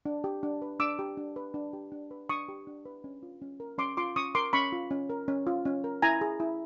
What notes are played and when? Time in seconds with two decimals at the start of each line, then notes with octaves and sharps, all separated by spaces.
0.05 D4
0.24 G4
0.43 D4
0.62 B4
0.80 D4 D6 E6
0.99 G4
1.17 D4
1.36 B4
1.54 D4
1.73 G4
1.92 D4
2.11 B4
2.29 D4 C#6 D#6
2.49 G4
2.67 D4
2.85 B4
3.04 C#4
3.23 F4
3.42 C#4
3.60 A#4
3.78 C#4 C6 D6
3.97 F4 C6 D6
4.16 C#4 C#6 D#6
4.35 A#4 C6 D6
4.53 C#4 B5 C#6
4.72 F4
4.91 C#4
5.10 A#4
5.28 C#4
5.47 F4
5.65 C#4
5.84 A#4
6.02 E4 G#5 A#5
6.21 G#4
6.40 E4